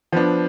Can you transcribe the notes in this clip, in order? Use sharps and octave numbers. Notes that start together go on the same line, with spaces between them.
F3 B3 D4